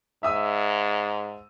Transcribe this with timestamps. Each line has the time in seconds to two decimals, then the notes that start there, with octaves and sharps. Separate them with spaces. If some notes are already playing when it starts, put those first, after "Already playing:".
0.23 G#2 E5 D#6 E6